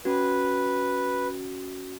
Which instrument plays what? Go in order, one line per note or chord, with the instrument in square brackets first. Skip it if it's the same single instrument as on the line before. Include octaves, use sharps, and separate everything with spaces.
[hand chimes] C#4 F#4 [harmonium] B4